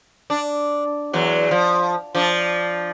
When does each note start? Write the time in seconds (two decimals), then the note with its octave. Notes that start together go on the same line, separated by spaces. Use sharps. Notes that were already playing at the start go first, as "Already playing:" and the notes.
0.30 D4
1.13 E2 F#3
1.51 F3
2.15 F3 D4